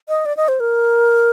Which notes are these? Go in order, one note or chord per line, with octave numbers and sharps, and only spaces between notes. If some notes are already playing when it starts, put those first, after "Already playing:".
D#5
D5
D#5
C5
A#4